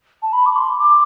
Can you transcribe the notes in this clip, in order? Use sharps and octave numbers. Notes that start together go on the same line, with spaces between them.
A5
B5
D6
C6
D6